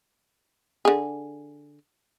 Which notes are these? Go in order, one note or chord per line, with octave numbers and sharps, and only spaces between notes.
D3 G#4